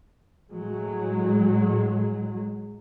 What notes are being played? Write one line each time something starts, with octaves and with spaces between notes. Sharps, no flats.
A2 F#3 G#3